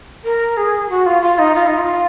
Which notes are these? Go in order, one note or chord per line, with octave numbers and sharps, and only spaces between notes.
A#4
G#4
F#4
F4
F4
D#4
F4
D#4
F4